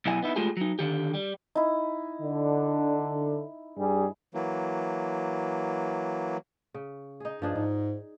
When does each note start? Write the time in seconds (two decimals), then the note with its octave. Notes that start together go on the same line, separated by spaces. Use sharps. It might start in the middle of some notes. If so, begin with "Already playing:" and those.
0.06 B2 F#3 E4 D#5 G#5
0.22 B3 D#4 E4
0.36 G#3 A3 F4 G4 G#4
0.57 F#3 D#4
0.79 D3 D#3 G4
1.14 G3
1.55 D#4 E4
2.22 D3
3.77 G2 G3 G#4
4.34 E3 F#3 A#3
6.74 C#3
7.20 D#4 G#4
7.42 G2 F3 D4 G#4
7.56 G#2 D#4